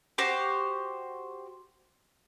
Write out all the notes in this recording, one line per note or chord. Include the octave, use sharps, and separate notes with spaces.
F#4 G4 C5 D6